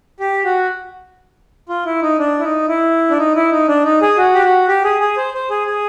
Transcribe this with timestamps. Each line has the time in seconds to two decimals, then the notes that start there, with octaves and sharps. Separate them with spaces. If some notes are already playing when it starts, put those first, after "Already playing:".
0.20 G4
0.45 F#4
1.69 F4
1.85 E4
2.02 D#4
2.19 D4
2.39 E4
2.44 D#4
2.68 E4
3.10 D4
3.18 D#4
3.35 E4
3.51 D#4
3.68 D4
3.84 D#4
4.02 G#4
4.18 F#4
4.35 G4
4.43 F#4
4.68 G4
4.84 G#4
5.01 G#4
5.17 C5
5.34 C5
5.50 G#4
5.67 G#4